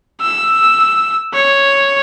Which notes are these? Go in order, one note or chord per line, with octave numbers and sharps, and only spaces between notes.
E6
C#5